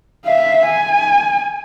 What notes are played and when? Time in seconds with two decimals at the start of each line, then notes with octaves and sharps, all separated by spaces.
0.25 E5 F5
0.66 G#5